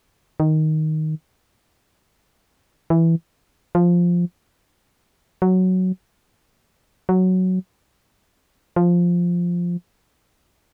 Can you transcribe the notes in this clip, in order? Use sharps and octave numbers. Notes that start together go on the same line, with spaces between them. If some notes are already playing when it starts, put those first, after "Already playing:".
D#3
E3
F3
F#3
F#3
F3